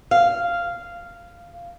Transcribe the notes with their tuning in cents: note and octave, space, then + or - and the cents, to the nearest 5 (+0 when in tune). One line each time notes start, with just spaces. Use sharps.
F5 -10